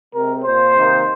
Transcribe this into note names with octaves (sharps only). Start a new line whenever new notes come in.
C3 G#3 C4 A#4
A#2 A#3 C5
C3 D#3 A#3